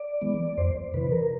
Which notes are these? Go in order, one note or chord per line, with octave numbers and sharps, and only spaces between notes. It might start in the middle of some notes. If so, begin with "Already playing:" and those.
Already playing: D5
E3 G#3 B3
F2 C5
C3 E3 B4
A#4